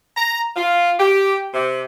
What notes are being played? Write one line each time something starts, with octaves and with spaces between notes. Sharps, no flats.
A#5
F4
G4
C3